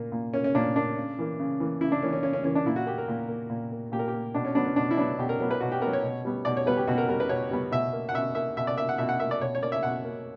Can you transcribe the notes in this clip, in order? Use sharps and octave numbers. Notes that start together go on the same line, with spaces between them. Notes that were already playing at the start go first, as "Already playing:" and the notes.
Already playing: A#2 A#3
A#2
A#3 C#4
C#4
A#2 D4
A#3 D4
C#3
E3 A#3
C#3
E3 A#3
C#3 E4
D4
E3 A#3 C#4
C#4
C#3 C#4
C#4
E3 A#3 C#4
D4
A#2 E4
F#4
A#3 G4
A#4
A#2
A#3
A#2
A#3
A#2 G4
A#4
G4
A#3
B2 D4
C#4
F#3 B3 D4
C#4
B2 D4
E4
F#3 B3 D4
B2 G4
A#4
F#3 B3 A#4
B4
B2 F#4
G4
F#3 B3 A#4
C#5
B2
G3 B3
B2 D5
C#5
G3 B3 B4
G4
B2 F#4
A#4
G3 B3 A#4
B4
B2 C#5
G3 B3
B2 E5
A#3
F#5
B2 E5
A#3 E5
B2 E5
D5
A#3 E5
F#5
B2 E5
F#5
A#3 E5
D5
B2 C#5
C#5
A#3 D5
E5
B2 F#5
A#3